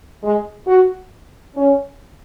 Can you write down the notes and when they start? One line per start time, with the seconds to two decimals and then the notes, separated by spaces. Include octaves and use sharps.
0.23 G#3
0.67 F#4
1.57 C#4